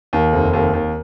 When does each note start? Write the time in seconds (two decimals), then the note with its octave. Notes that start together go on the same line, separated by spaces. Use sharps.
0.13 D#2
0.33 F1
0.53 D#2
0.74 D#2